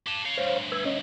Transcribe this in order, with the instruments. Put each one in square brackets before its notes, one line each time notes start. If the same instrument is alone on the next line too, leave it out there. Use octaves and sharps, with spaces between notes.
[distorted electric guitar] G4 A5
C#5 F5
[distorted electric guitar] D2 G2 [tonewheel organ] C5 C#5 F5
[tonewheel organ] B4 E6 G#6
C#4 C#5 D#5